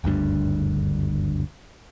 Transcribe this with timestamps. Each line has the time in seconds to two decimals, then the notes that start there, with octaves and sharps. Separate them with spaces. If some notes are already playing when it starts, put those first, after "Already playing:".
0.04 F#1 D2 G2 D3